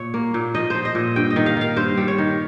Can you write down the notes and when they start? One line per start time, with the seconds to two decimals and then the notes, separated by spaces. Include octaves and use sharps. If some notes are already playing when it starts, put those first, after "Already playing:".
Already playing: A#2 C#5
0.14 A#3
0.34 A#2
0.55 F3 D#5
0.70 F3 C5
0.85 D#5
0.95 A#2
1.16 G2 G5
1.30 D#5
1.36 D#3
1.46 F5
1.57 D#3 F5
1.76 G2 C5
1.97 G3
2.08 C#5
2.18 D#3